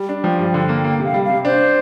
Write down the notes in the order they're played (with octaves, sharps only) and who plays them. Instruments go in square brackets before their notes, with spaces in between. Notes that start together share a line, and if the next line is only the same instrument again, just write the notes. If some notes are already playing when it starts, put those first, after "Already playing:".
Already playing: [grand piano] G3
D4
[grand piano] F3 [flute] G5
[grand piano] G2
[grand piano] D3 [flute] G5
[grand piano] A#3
[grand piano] A#3 [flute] G5
[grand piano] C3 [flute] F5
[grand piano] G3
[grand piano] C3 [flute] F5
[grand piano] D4 [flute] C5